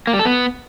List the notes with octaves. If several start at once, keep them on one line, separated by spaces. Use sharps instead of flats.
A#3
G3
A4
B3